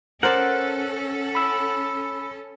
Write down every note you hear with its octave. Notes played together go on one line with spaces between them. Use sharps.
C#4 A4 A#4 C5 D5 F#5
B5 E6